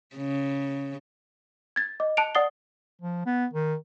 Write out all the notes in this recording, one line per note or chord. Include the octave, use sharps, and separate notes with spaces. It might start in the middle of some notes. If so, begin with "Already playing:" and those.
C#3
G#6 A6
D#5 D6
A5 F#6 C#7 D7 F7
D5 F#5 D#6 A6 C7 G7
F3
B3
D#3